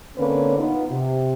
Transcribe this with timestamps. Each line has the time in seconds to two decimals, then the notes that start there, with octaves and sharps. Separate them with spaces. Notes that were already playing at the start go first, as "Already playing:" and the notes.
0.18 D3 A#3 C4 C#4 B4 C#5
0.57 B3 D#4 F4
0.89 C3